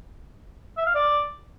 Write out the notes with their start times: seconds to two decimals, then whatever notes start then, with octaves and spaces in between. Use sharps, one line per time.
0.78 E5
0.86 F5
0.95 D5